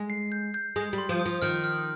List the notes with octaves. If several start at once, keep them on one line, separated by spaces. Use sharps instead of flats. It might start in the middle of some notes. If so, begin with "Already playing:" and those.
Already playing: G#3
C7
G6
G6
G#3 D#6
G3
C6
F3
D#6
F3
D#3 F6
F6